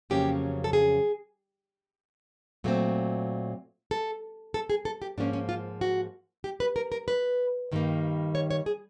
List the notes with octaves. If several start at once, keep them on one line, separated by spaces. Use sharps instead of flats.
F2 C#3 F#3 A#3 C#4 G4
A4
G#4
A#2 F#3 A3 C4
A4
A4
G#4
A4
G4
G#2 F3 A#3 C#4 D4
C#4
F4
F#4
G4
B4
A#4
A#4
B4
G2 D#3 G3 A#3
C#5
C#5
G#4